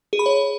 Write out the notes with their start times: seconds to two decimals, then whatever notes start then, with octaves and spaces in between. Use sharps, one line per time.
0.13 G#4
0.19 B5
0.26 C#5